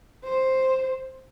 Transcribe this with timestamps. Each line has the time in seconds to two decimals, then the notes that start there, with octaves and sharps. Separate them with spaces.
0.24 C5